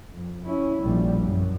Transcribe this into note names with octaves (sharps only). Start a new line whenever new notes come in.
F2
C#4 E4
A#1 G3
F#2